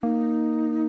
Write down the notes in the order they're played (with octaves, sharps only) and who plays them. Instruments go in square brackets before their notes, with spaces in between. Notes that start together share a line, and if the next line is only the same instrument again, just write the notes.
[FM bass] A#3 [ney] D#4